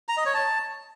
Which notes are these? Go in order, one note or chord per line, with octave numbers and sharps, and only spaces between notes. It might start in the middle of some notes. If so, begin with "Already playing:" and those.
A#5
D#5
C#5
A5